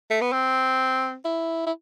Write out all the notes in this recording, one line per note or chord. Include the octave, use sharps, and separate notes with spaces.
A3
B3
C4
E4
E4